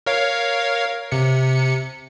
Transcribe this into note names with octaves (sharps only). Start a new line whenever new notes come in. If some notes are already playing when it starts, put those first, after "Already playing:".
A#4 C#5 F5
C3 C#7